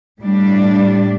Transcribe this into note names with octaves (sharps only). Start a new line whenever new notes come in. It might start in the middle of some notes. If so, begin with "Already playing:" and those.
A2 G3 D4